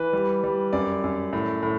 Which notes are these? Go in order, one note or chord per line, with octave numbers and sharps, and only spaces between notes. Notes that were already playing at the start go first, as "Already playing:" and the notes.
Already playing: E3 B4
G3
G3
F#2 D5
F#2
A2
A2